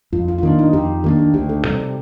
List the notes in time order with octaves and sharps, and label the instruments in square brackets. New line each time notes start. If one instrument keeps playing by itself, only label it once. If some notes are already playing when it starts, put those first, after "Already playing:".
[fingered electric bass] F2 [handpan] F4
[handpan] F4
F4
[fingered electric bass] D#3 A#3 D4 [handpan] D#4
[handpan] D#4
[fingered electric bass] F2 [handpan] G4
[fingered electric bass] D#3 A#3 D4 [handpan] G4
[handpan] G4
[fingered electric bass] D2 [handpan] G4
[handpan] A4
[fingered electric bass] C3 G3 [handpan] G4
[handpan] G4